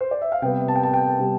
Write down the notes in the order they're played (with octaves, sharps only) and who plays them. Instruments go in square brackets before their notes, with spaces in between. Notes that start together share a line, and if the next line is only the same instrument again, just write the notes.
[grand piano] C5
D5
E5
F5
C3 G3 B3 G5
A5
G5
A5
G5
C3 G3 B3